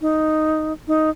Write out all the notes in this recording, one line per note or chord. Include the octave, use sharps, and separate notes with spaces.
D#4
D#4